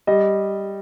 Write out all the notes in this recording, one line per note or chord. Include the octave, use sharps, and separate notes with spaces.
G3 D#5